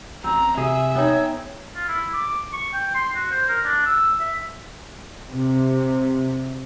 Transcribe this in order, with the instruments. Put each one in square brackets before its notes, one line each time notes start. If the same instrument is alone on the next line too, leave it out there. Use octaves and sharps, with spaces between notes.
[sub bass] A1 [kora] C4 [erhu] A#5
[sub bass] C3 [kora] G#4 [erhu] E5
[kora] B3 D#4 [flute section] C#5 G5
[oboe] F4
E4
D6
C#6
G5
C6
F#4
C5
A#4
D4
E6
E5
[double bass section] C3